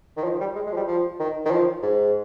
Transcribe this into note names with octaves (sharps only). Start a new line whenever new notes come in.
D#3
F3
G3
G#3
G#3
F3
G3
F3
D#3
D#3
F3
G#2